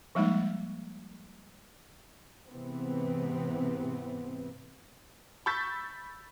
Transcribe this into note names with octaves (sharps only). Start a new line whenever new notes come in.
F3 G3 G#3 A#3 D#4
G#2 C3 E3 B3 C4
B5 C#6 E6 G6 A6 B6